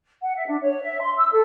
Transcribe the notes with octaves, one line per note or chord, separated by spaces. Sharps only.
F#5
E5
D4
C#5
E5
C6
E6
A4